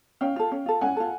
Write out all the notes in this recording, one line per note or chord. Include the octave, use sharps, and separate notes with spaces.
C#4 F5 G5
F4 A4
C#4
F4 A4
C#4 F#5 G#5
F4 A4